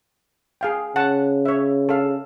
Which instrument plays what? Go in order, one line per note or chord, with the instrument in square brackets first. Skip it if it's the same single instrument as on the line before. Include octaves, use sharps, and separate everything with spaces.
[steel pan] G#4 F5 G5
[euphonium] C#3 [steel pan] F#5 A5
[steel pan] C#5 E5
A4 F5